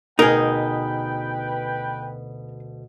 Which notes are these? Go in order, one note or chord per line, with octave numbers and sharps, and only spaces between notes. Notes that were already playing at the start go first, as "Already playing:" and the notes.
D2 B2 D#4 G#4 A#4 B4 G5